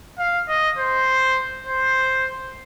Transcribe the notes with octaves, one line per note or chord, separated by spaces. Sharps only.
F5
D#5
C5
C5